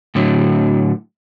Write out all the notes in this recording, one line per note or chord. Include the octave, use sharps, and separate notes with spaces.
A2 D3 F#3